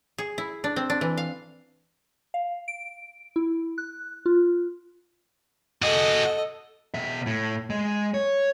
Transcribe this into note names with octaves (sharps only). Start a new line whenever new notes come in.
G#4
E4
D4
C4
D4
E3
F5
F5
D7
E4
F#6
F4
F#4 G#4 A4 D#5
B2 E5
A2
G#3
C#5